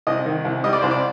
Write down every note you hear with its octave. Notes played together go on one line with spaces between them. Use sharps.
C2 D#5
D#3
C2
G3 D#5
D5
C2 C5
D5